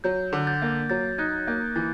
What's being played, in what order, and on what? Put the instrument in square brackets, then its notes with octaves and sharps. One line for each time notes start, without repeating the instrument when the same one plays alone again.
[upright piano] F#3 [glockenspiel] G6
[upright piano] D3
[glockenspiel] G6 A6
[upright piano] A#3
[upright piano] F#3 [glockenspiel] G6 A6
[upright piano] D#4 [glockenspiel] F#6 G#6
[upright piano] A#3 [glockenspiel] G6
[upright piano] E3 [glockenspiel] G6 A6